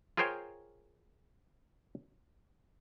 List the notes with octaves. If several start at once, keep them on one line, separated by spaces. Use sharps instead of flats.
F4 G#4 A#4 C5 C#5 G5